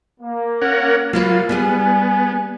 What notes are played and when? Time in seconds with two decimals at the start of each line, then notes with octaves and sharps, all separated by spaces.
0.20 A#3
0.62 C#4 A#4 F#5
1.13 F#3 A#3 E4 F4 B4
1.49 G3 B3 E4 G#4 G#5